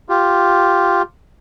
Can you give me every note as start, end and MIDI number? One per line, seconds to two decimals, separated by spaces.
0.09 1.02 65
0.09 1.02 67